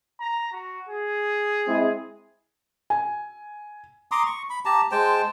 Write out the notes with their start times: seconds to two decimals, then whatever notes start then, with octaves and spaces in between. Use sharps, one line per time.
0.21 A#5
0.53 F#4
0.89 G#4
1.66 G#3 C4 E4
2.90 G#5
4.11 A#5 C6 D6 D#6
4.26 C#6
4.50 B5
4.65 G4 A5 A#5
4.92 G#3 C5 G5 A5